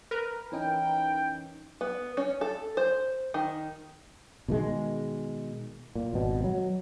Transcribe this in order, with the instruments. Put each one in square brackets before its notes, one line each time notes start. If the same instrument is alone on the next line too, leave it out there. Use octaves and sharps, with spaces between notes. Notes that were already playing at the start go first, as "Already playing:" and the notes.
[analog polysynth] A#4 B4
[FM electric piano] E3 C#4 D#4 [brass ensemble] G5
[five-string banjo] B3
C#4
A4
C5
D#3
[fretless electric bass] B2 D#3 G#3
A#2
G#1 B2
F#3